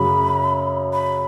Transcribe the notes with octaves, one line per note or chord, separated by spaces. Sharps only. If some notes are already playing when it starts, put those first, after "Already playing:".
Already playing: F#2 C#3 F#3 B5
B5